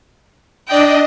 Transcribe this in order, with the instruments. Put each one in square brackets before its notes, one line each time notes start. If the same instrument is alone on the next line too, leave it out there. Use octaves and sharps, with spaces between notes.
[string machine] D4 D#5 [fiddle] D5 G5